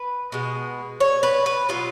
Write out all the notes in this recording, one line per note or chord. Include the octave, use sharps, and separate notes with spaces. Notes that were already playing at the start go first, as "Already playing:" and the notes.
Already playing: B4
B2 G#3
C#5
B4
B4
B2 F#3 F4